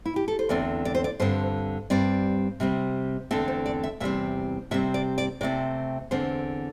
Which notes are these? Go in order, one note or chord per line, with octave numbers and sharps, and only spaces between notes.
E4
G4
A4
C5
E2 D3 A3 C4 D5
D5
C5
D5
G2 D3 C4 C5
G2 G3 C4 D5
C3 G3 C4
E2 D3 A3 C4 E5
C5
D5
E5
E2 C3 G3 C4 E5
C3 G3 C4 E5
D5
D5
C3 A3 C4 D5
E2 D3 C4 C5